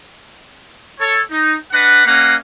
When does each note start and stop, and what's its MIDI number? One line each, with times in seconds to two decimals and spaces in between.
0.99 1.20 69
0.99 1.20 73
1.30 1.56 63
1.72 2.04 62
1.72 2.04 71
1.72 2.04 75
1.72 2.04 78
2.06 2.36 58
2.06 2.36 61
2.06 2.36 75
2.06 2.36 77
2.06 2.36 78